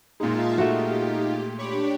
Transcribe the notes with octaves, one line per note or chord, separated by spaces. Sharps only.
A#2 G#3 D#4 F4 E5 F5 A5
A3 F#4 G4
D4 G4 C#5 B5 D6